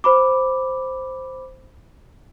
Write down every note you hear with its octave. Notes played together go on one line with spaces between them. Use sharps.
C5 B5 D6